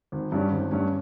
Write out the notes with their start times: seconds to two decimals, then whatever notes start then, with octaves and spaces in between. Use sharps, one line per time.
0.12 G#1
0.32 G2 G3 C#4
0.51 G#1
0.71 G2 G3 C#4